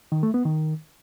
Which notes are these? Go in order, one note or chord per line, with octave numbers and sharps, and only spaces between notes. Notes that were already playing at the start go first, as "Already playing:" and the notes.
D#3
A3
B3
D#3